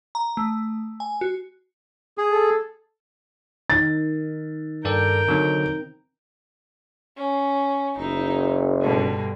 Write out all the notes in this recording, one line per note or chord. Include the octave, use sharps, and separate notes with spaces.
A#5
A3
G#5
F#4
G#4
A4
D#3 D#4 A6
G2 A4 A#4 D5 G5
D3 F#3 C4 D#4
C#4
F#1 D#4 E4
G2 B2 D3